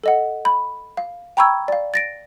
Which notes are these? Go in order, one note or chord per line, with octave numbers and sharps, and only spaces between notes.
A4 D#5 F#5
B5
F5
G5 A#5 B5 C#6 E6 G#6
D5 F5
A6 A#6 D7